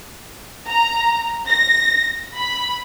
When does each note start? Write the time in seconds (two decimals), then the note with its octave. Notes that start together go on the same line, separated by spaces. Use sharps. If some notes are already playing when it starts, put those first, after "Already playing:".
0.68 A#5
1.47 A#6
2.36 B5